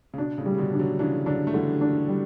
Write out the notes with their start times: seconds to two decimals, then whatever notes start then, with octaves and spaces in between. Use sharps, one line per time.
0.14 C#3
0.18 B2 D4
0.38 A2 C#3
0.46 G3
0.55 C#3
0.58 B2 D3
0.73 D4
0.79 D3 F#3
0.99 C#3 E3 D4
1.26 D3 F#3 D4
1.47 A3
1.53 D3 E3 G3
1.81 D4
2.08 G3